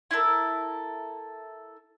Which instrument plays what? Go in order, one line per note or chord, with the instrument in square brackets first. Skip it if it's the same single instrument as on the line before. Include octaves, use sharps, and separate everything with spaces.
[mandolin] E4 F4 A4 A#4